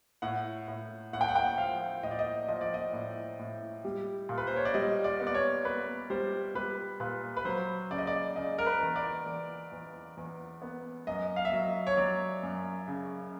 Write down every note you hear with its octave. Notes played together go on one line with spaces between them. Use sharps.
A2 F#5
A2
A2 F#5
G5
F#5
G5
F#5
F3 F5
A2 D#5
D5
D#5
F3 D#5
D5
D#5
A2
A2
G3
A#2
B4
C5
C#5
D5
G3 D#5
D5
B3
D5
C#5
B3 B4
G3 C5
G3 B4
A#2 B4
B4
F#3 C5
C#3 D5
D#5
D5
C#3 D#5
A#4
B4
E2
D5
E2
E2
E2
B3
F#2 D#5
F5
E5
F#3 D#5
C#5
F#3 D5
F#2
C#3